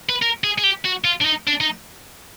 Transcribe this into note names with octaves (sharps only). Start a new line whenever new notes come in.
B4
A#4
G#4
G#4
G4
F#4
F4
D4
D#4
D4
D#4